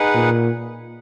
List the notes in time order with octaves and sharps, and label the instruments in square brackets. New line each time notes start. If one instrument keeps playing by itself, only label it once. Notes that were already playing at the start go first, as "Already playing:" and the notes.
Already playing: [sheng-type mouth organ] D#4 G#4 B4 F#5
[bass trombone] A#2